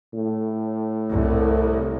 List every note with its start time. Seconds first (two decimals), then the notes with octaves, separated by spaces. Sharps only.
0.14 A2
1.11 C2